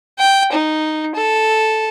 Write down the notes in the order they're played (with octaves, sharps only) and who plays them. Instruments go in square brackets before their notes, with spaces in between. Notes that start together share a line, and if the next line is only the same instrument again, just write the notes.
[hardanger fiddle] G5
D#4
A4